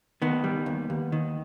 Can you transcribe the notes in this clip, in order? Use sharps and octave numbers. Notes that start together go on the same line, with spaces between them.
D#3 B3
G3
D#2
D#2
D#3